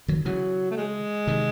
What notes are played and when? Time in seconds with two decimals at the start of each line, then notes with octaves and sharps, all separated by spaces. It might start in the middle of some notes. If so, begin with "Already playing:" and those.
0.08 D#3 F#3
0.25 C#3 E3 F#3
0.71 A3
0.77 G#3
1.27 C3 D#3